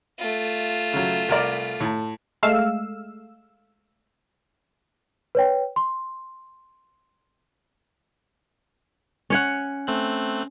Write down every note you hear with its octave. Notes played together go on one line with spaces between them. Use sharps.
A3 F4
C#3 F#3
C2 A#4 D5
A2 A5
G#3 A3 F5 E6
B4 C#5 G5
C6
C#4 C#5 F#5
A3 C4 F#6